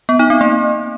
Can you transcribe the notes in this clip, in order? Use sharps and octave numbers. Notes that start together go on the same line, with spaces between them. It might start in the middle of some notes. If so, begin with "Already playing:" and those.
B3
D#4
C4
A#3